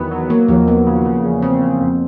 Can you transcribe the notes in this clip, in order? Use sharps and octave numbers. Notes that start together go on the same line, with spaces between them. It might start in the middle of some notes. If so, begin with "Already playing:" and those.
Already playing: E2 D#3 F#3 B3
F#3
F#3 A#3
D#2 F3
D#2 B3
C#3
C#3
E2
C#3 C4
C#3
F2